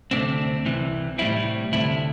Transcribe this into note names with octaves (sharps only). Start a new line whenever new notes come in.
D2 C3 A3 C4 D4
C2 C3 E3
A2 G3 C4 E4
D2 C3 A3 E4